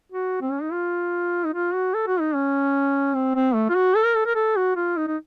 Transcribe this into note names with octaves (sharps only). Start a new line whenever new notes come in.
F#4
C4
C#4
D#4
F4
D#4
F4
F#4
A4
F#4
D#4
C#4
C4
C4
A3
F4
F#4
A4
A#4
A4
A#4
A4
F#4
F4
D#4
D#4